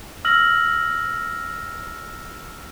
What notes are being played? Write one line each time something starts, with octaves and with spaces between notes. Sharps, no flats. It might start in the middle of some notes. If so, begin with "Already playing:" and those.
E6 F6 A#6 F#7